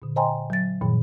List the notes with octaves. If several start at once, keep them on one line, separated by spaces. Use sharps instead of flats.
A#2 D3
C5 D#5 G5 G#5 A#5 C6
F#3 A6
F#2 A#2 D#3 F3